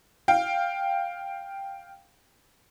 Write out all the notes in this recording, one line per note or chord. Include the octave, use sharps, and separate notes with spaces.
F5 G5